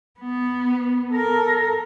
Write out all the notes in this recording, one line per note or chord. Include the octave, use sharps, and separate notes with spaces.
B3
A4 A#4